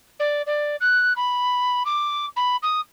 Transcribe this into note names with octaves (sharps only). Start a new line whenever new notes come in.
D5
D5
F#6
B5
D6
B5
D#6